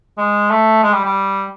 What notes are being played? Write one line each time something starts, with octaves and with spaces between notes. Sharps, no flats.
G#3
A3
G#3
G3
G3